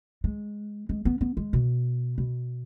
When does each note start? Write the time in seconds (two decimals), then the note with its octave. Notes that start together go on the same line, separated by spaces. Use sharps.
0.24 G#3
0.89 G#3
1.05 B3
1.21 B3
1.37 G#3
1.53 B2
2.18 B2